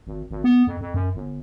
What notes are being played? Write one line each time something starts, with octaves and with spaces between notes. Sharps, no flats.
G#1
G#1
B3
F2
F2
F#2
G1